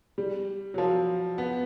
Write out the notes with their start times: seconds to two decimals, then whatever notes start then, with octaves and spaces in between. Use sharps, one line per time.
0.18 G3
0.74 F#3
0.78 F3
1.38 B3